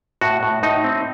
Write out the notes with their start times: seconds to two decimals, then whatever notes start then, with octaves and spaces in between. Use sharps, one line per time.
0.21 A2 F#4
0.43 A2
0.63 A2 D#4
0.84 C4